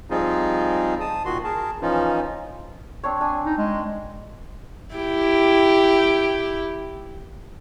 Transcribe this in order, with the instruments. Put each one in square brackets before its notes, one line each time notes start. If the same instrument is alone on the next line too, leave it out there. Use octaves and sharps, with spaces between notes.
[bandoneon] F3 G3 C4 D#4 F4 G#4
A5 D#6
A#2 D#3 F#4 C6
G#4 A#4 A5
E3 F3 C#4 D#4 F4
[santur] C4 D4 C#5
D4 G#5
[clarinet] D#4
G#3
[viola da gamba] E4 G4